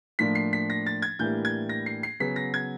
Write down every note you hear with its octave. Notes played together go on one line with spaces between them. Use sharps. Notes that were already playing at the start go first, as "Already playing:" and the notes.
A2 F3 A#3 D4 B6
C7
B6
A#6
A6
G#6
A2 E3 G3 A#3 D4 G6
G#6
A#6
C7
C7
C#3 F#3 B3 B6
A#6
G#6